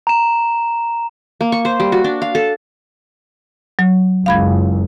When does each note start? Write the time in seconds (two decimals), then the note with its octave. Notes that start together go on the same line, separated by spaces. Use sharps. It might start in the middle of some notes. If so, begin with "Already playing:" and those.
0.07 A#5 E7
1.41 A#3
1.52 C#6
1.65 C5
1.80 G3
1.92 F#4
2.04 D4
2.22 F5
2.35 A4
3.79 F#3
4.26 F#1 C#2 F5 B5 G#6